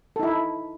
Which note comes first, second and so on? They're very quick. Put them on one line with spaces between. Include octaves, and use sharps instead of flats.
A4 D#4 E4